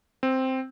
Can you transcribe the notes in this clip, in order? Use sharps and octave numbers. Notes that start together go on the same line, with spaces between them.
C4